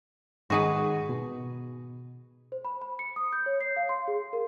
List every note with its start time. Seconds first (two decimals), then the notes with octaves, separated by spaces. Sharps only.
0.50 G#2 D#3 D#4 F#4 G#4 B4
1.09 B2
2.52 C5
2.65 B5
2.81 B5
2.99 C#7
3.16 D#6
3.33 G6
3.46 C#5
3.61 C7
3.76 F5
3.89 C6
4.08 G#4
4.33 A#4